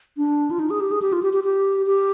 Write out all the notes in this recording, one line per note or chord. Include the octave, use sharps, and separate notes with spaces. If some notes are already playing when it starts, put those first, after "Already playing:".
D4
F4
D#4
G#4
G4
G#4
G4
F4
G4
G4
G4
G4